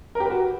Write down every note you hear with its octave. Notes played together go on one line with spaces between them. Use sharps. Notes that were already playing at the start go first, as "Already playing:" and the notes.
A#4
G4
B4
F#4